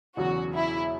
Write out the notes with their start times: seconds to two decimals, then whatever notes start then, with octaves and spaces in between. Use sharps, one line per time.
0.17 E1 E2 C#3 F#3 F#4
0.53 E4